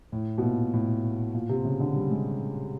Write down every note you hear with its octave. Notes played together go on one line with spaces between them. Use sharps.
A2
B2
A#2
A2
A#2
C3
C#3
D3
G3
G#3